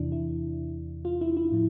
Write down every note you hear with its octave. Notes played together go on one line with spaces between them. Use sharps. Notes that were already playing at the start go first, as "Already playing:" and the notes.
Already playing: E2 C3 E3 D4 E4
E4
F4
E4
E4
A2 F3